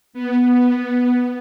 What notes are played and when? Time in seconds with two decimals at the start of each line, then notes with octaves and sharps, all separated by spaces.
0.13 B3